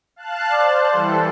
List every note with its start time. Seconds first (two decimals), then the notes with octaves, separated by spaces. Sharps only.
0.16 F5 A5 F#6
0.52 C5 D5
0.91 E3 G3 A4